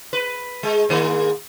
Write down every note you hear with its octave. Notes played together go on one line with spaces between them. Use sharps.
B4
G#3
G#2 D#3 A#3